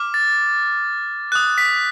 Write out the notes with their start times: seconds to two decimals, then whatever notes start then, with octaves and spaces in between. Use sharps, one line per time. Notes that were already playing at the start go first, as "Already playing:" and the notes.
Already playing: D6 F6
0.14 A6
1.32 D#6 F#6
1.58 B6